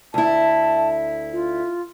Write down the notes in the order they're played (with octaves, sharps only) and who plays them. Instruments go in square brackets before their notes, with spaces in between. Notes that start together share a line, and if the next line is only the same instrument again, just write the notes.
[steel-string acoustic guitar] D2 E4 [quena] A5
[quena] F4